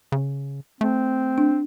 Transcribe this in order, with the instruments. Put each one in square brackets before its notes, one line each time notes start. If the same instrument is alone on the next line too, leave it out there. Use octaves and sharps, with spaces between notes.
[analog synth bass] C#3
[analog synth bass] A3 [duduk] C4
[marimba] D4